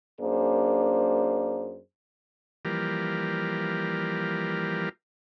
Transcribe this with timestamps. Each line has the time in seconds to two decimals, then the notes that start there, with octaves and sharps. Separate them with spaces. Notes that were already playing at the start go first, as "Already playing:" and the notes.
0.20 F#2 A#3 D4 G#4 C5
2.65 E3 F3 G3 A#3 G4 A#4